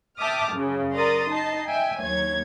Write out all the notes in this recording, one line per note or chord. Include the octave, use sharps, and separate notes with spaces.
E5 G5 A5 D6 D#6 F6
F#2 C#3
A#4 D5 A#5 C6 D#6 A6
D#4 D#5 A5 C7
E5 G5 G#5
D#2 F#3 C#5 G#6